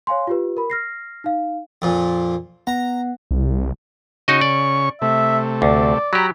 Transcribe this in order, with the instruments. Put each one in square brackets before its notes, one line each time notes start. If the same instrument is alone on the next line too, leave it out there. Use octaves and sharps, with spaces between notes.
[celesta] C#5 F5 G#5 C6
F4 G4 B4
A#4 B5
F6 A#6 C7
D#4 F5
[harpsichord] F2 A#2
[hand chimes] B3 F#5 [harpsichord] A#5
[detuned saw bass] C2
[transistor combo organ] C#3 C#6 [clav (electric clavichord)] D#4 F#4 D#5
[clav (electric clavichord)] D5
[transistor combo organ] C3 A3 [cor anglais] E5
[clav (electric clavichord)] D2 [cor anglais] D5
[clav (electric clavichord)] F#3 G4 [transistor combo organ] A#5 B5